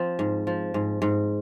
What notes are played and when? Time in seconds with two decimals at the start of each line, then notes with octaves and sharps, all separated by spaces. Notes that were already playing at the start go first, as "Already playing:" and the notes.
Already playing: F3 C4
0.19 G#2
0.47 F3
0.74 G#2
1.02 G#2